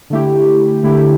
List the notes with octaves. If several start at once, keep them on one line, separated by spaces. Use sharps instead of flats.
D3 A3 E4 G4
D3 A3 E4 G4